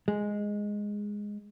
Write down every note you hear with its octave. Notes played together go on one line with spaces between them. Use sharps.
G#3